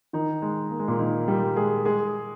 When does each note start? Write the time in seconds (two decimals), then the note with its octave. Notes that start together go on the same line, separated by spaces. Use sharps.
0.13 D#3 D#4
0.42 G#3
0.71 A#3
0.79 G#3
0.88 A#2 A#3
0.99 D#3 D#4
1.28 G3 G4
1.56 G#3 G#4
1.85 G#3 G#4